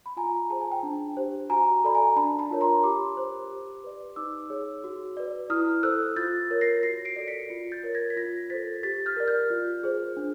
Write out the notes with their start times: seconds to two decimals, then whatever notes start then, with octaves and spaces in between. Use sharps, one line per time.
0.06 B5
0.17 F4 G#5 A#5
0.50 G#4 C5 A5
0.61 G#5
0.71 G5 A5
0.83 D4
1.17 G4 C5
1.50 F#4 G#5 A#5
1.84 A4 D5 B5
1.95 G#5 A#5
2.16 D4 A5 B5
2.39 A5 B5
2.50 F4 A#4 C#5
2.61 A#5 C6
2.83 G4 C6 D6
3.17 C5
3.51 G4
3.84 B4 D5
4.16 D#4 D6 E6
4.50 G#4 C#5
4.84 F#4
5.17 B4 D5
5.50 E4 D#6 F6
5.83 A4 C5 E6 F#6
6.16 F4 G6 A6
6.51 A#4 C#5
6.61 A#6 C7
6.83 F#4 A#6 C7
7.05 C7 D7
7.16 A4 D5
7.27 B6 C#7
7.50 F4
7.72 G6 A6
7.84 A#4 C#5
7.95 G#6 A#6
8.10 B6
8.16 F4 G#6 A#6
8.50 A4 C5 A6 B6
8.83 G4 A6 B6
9.06 F6 G6
9.16 A#4 D5
9.28 F6 G6
9.50 F4
9.83 G#4 C5
10.17 D4